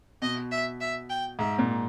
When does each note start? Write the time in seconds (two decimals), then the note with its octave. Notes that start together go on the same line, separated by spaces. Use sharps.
0.22 B2 D#5
0.51 E5
0.81 E5
1.10 G5
1.39 G#2 E5
1.59 A#2